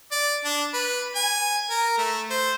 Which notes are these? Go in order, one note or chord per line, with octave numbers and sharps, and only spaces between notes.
D5
D4
B4
G#5
A#4
A3
C5